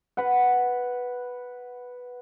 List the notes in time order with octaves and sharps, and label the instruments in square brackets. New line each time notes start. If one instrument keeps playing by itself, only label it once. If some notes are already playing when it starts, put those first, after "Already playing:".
[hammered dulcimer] B4 F#5